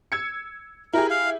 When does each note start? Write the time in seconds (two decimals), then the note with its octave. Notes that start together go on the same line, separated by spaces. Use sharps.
0.12 E6 G#6 C#7
0.93 E4 G4 G#4 A#4
1.10 F5